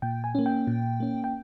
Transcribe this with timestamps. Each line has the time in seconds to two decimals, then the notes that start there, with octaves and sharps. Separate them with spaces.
0.02 A#2 G5
0.24 G#5
0.35 A#3 C#4
0.46 G5
0.67 A#2
1.00 A#3 C#4
1.24 G5